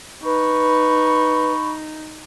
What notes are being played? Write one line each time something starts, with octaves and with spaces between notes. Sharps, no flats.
D#4 B4 B5 C#6